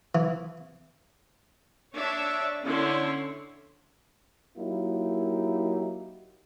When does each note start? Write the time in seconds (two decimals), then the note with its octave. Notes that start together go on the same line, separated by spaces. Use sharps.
0.15 E3
1.95 D4 C#5 E5
2.64 D3 C#4 E4 C#5 C6
4.57 F#3 A#3 D#4 E4 G4